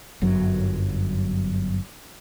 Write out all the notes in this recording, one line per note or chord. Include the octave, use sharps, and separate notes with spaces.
G1 F#2 F#3